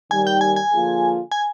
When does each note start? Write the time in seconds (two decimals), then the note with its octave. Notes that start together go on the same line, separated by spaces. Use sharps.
0.11 D#2 D#3 G3 G#5
0.27 G5
0.41 G#5
0.56 G#5
0.72 D3 F3 A#3 F4 G#4
1.32 G#5